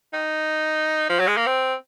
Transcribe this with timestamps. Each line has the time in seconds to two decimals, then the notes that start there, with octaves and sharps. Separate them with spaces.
0.14 D#4
1.09 F3
1.19 F#3
1.27 G#3
1.37 A#3
1.46 C4